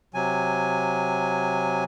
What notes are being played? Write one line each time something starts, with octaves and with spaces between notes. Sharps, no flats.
C3 F#3 G#5